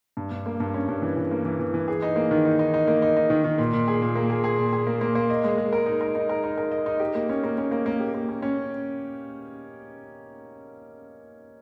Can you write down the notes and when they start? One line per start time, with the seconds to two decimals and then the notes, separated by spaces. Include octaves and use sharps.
0.17 G2
0.31 G2
0.46 A#3
0.60 G2
0.74 C#4
0.88 G2
1.02 E3
1.17 E3
1.31 A#3
1.45 E3
1.59 E3
1.74 E3
1.88 G#4
2.02 D#4
2.16 A#3
2.31 D#3
2.45 D#4
2.59 D#4
2.74 D#4
2.88 A#3
3.02 D#4
3.17 D#4
3.30 D#3
3.44 D#3
3.58 A#2
3.73 A#2
3.88 G#4
4.02 A#2
4.15 A#3
4.30 G#4
4.44 G#4
4.58 A#2
4.73 G#4
4.87 A#3
5.01 A#3
5.15 A#3
5.30 D#5
5.44 G#3
5.58 G#3
5.73 A#4
5.86 D#4
6.01 A#4
6.15 D#4
6.29 A#4
6.44 D#4
6.58 A#4
6.72 D#5
6.86 D#4
7.00 G4
7.15 A#3
7.29 C#4
7.43 A#3
7.58 C#4
7.71 A#3
7.86 A#3
8.00 G4
8.14 A#3
8.28 C#4
8.42 C#4